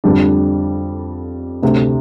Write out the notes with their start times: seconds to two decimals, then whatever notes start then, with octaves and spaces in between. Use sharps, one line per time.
0.04 F2 D3 G3 D4
1.62 D2 C3 A3 D4 G4